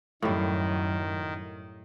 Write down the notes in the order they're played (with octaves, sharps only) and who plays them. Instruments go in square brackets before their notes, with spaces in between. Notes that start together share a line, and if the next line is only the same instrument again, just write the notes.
[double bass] F#2 [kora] A2 G3 [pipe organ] D#3